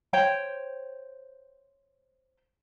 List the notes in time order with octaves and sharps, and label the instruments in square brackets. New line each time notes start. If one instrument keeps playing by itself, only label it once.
[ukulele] C5 C#5 G5